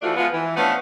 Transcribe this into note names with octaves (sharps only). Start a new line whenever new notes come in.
E3 F3 A3 D4 F4 F#4
F3 G#3 B3 F4
E3
F3 A3 B3 C#4 D4